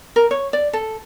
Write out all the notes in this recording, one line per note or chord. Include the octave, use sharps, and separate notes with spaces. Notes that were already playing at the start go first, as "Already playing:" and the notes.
A#4
C#5
D5
A4